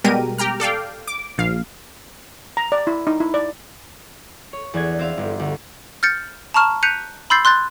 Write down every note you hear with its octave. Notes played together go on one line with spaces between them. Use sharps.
B2 G3 G#3 G4 A#4 D#7
G4 G5 A#5 F6
A4 D5 F5 G5
D6
A#1 F5
A#5
D5
E4
D#4
E4
D5
C#5
E2 D4 G#6
C4 C5 E5 F5
G1
D2
F6 G6 A6 C#7
A5 A#5 C#6 F6 E7
F#6 G6 B6 C#7 D#7 F7
B5 C6 E6 G6 A6 C7
C6 F#6 G6 A6